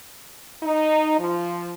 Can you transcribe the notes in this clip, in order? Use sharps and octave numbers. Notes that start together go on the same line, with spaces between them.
D#4
F3